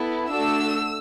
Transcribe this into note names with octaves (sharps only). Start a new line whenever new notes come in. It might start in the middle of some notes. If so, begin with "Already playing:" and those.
Already playing: B3 E4 A4
A3 D4 F#4 A4 E6